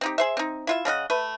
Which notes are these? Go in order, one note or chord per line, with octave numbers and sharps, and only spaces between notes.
C4 D#4 G4
G#4 C5 E5
C4 D#4
E4 F4 E5
C#3 C#4 D#5 F#5
A3 B4